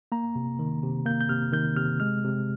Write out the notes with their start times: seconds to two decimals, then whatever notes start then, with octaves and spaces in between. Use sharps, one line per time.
0.12 A#3 A#5
0.35 C3
0.59 D#3
0.83 C3
1.06 A#3 G6
1.21 G6
1.29 C3 F6
1.52 D#3 G6
1.77 C3 F6
2.00 G#3 F6
2.24 C3